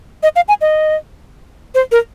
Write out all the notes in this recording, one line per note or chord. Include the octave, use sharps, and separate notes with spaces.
D#5
F5
G#5
D#5
C5
A#4